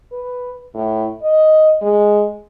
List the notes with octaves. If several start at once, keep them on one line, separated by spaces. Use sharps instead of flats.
B4
A2
D#5
G#3